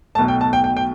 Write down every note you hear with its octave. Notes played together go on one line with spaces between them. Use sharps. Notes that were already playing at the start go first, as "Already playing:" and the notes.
B1 B2 A3 A5
G5
A5
G5
G5
G5